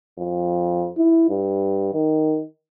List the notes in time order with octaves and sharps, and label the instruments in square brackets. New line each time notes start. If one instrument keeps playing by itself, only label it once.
[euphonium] F2
E4
G2
D#3